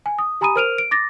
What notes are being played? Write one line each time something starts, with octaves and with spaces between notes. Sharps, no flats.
G#5
D#6
G4 G#5 A#5 B5 D#6 D#7
A#4 C5 F6 D7 D#7 F7
D7
D6 A6 A#6